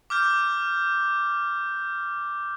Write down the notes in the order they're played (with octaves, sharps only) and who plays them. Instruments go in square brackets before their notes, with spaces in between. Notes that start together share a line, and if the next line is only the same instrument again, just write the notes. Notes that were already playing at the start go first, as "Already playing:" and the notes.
[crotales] D6 F6 G6